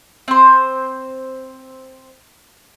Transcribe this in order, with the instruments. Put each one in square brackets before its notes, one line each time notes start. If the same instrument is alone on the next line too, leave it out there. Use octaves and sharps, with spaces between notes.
[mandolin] C4 C5